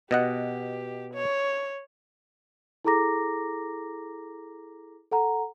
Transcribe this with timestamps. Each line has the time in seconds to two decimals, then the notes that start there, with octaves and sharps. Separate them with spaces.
0.11 B2 G4 D#5 F#5
1.14 C#5
2.85 E4 G#4 A4 A#5 D6 A#6
5.12 A4 F#5 A#5